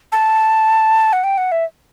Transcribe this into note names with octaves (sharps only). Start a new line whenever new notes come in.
A5
F#5
G5
F#5
E5